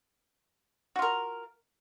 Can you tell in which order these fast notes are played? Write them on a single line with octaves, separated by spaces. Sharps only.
F#4 F4 A#4